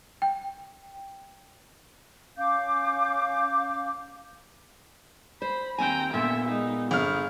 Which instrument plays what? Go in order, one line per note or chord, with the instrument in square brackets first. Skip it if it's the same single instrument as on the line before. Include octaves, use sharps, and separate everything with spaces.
[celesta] G5
[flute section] C#4 F5 D6 G6
[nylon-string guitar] C5 [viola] B5
[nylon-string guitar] D#2 C4 G#5 [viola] G5 A#5
[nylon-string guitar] A#2 B3 [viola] D3 E5
[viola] G#3 D#4
[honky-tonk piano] G1 F6 [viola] G#4